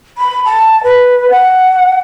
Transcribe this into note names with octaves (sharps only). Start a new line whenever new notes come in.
B5
A5
B4
F#5